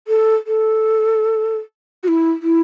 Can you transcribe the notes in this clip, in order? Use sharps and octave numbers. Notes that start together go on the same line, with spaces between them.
A4
A4
F#4
E4
E4